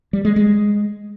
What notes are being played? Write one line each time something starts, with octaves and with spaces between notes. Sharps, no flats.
G3
G#3
G#3